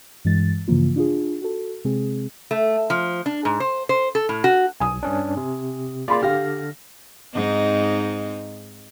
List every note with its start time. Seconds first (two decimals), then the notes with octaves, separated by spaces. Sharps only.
0.25 G2 E3 G#3 A6
0.68 G2 C#3 E3 F3 A#3 F4
0.96 D4 F4 G#4
1.42 F#4 A4
1.85 C3 G#3 C4 G#4
2.51 A3
2.90 F3
3.26 D4
3.45 G#2
3.60 C5
3.89 C5
4.15 A4
4.29 A2
4.44 F#4
4.80 B1 G#5 D#6
5.03 G2 C#4 D4
5.37 C3
6.08 A#3 F4 G#4 D5 B5 C6
6.22 D3 G4 F5 F6 A#6
7.34 G#2 C4 D#4